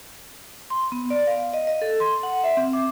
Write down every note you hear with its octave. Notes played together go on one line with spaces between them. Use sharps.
C6
B3
D5
F5
D#5
D#5
A4
C6
F#5
E5
C4
D6